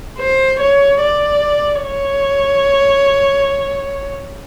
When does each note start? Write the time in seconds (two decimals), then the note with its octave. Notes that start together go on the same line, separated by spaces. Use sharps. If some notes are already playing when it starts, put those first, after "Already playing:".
0.19 C5
0.60 C#5
1.01 D5
1.84 C#5